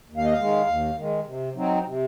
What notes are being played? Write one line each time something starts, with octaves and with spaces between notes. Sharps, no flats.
D#2
F5
D#5
F5
D#3 G#3
D#2
D#3 G#3
C3
F#3 C4 D#4
C3